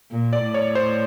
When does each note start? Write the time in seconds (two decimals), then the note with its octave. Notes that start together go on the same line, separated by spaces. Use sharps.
0.11 A#2
0.33 D5
0.43 A2
0.54 C#5
0.75 C5